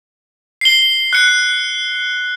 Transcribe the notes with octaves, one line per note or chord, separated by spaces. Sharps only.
C7 G7
F#6 C#7